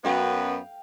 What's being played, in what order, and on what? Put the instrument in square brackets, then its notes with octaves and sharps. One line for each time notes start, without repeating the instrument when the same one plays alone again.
[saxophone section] F#2 B3 [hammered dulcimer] F5 G5